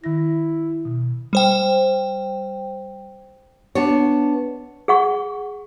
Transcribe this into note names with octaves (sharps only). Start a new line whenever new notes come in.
D#3 E4 A#6
B2
G3 C5 G5
B3 D4 C#5
G#4 F#5 C#6